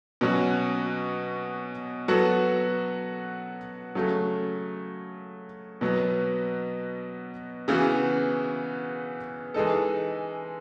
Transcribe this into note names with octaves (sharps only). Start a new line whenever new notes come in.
B2 F#3 C#4 F#4
F#3 B3 F#4 A4
C#3 F#3 A3
B2 F#3 B3
C#3 E3 B3 F#4
E3 G#3 D#4 A4